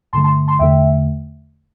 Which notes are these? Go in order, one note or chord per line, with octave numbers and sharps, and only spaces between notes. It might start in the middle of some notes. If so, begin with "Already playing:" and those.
G2 D3 A3 A5 C6
A5 C6
A5 C6
E2 D3 A3 E5 G5